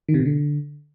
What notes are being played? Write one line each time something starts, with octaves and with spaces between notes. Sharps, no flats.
D#3
C3
B2
D3